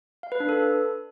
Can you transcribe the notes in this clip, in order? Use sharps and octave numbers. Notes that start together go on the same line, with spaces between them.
F5
B4
D4
A4